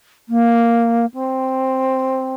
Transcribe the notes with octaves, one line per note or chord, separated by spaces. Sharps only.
A#3
C4